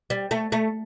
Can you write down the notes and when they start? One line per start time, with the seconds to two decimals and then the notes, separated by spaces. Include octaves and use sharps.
0.10 G3
0.31 A3
0.52 A3